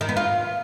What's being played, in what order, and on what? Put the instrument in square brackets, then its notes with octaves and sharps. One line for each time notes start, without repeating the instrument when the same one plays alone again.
[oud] D#3
B3
F4